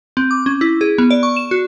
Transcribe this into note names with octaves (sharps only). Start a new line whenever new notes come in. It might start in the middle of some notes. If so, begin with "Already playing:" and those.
C4
D6
C#4
E4
G#4
B3
D5
C#6
E7
F#4